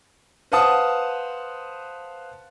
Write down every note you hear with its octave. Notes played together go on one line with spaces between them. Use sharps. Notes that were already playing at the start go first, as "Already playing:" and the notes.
B4 C5 F5 F#5 A5 D#6